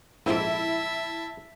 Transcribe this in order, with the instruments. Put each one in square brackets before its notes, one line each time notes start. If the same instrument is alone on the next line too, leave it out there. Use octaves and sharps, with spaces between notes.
[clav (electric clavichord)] A#1 F2 G#2 [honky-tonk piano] E4 [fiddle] E5 A5